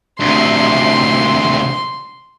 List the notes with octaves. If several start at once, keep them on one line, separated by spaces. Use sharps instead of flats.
D2 C3 C6